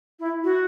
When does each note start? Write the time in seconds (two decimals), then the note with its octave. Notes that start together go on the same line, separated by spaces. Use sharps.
0.19 E4
0.43 F#4